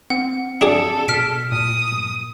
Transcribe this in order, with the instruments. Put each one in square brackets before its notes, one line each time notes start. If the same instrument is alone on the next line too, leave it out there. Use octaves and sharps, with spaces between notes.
[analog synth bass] C4 [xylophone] F#5
[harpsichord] D4 G#4 A5 [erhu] A4
[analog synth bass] B2 [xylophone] F6 B6 D7
[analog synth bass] A#2 [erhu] D#6